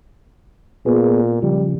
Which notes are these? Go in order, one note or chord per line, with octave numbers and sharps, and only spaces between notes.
A#2 B3 G#4
C#3 F3 G3